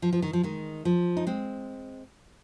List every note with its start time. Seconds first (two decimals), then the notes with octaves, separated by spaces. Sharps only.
0.02 F3
0.13 F3
0.22 D#3
0.33 F3
0.43 D#3 G#3
0.85 F3
1.17 D#4
1.27 G#3 C4